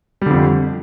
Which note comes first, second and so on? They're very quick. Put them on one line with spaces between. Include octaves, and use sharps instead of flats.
G3 D3 F2